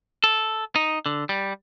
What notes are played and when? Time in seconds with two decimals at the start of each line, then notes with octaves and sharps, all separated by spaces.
0.24 A4
0.76 D#4
1.06 D3
1.29 G3